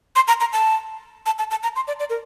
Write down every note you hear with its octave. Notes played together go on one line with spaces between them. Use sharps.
C6
A#5
A#5
A5
A5
A5
A5
A#5
C6
D5
D5
A#4